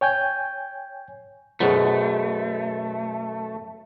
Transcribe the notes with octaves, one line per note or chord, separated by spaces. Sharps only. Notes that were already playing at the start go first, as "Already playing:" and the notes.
C#5 G5 G#5 G6
F#2 B2 A3 F4 G#4 C5